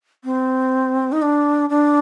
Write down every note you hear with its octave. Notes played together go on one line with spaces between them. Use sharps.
C4
D#4
D4
D4